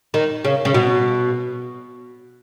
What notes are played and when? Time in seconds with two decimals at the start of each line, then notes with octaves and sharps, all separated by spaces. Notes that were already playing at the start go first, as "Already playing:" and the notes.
0.14 D#3
0.44 C#3
0.65 C#3
0.74 B2